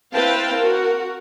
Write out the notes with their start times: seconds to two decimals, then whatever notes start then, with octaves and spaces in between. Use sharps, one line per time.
0.14 C4 E4 B4 F5 G5 A5
0.57 F#4 A#4